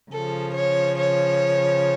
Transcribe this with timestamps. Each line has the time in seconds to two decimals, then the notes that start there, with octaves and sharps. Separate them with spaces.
0.11 C#3 F3 A4
0.54 C#5
0.97 C#5